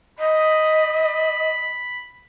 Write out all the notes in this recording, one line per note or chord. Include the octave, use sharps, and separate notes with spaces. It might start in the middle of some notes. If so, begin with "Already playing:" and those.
D#5 B5